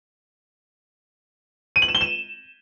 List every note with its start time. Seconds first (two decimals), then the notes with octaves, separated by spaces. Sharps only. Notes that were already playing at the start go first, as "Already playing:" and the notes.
1.76 D#7
1.82 F#7
1.88 E7
1.95 G7
2.01 E7